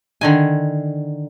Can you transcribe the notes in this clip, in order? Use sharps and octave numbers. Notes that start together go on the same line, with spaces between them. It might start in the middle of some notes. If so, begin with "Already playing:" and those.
D3 D#3 G#5